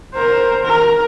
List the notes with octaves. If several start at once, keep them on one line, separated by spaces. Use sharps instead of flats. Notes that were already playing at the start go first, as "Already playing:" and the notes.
A#4 C5
A#4